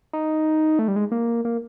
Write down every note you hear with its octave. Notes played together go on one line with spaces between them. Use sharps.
D#4
A3
G3
G#3
A#3
A#3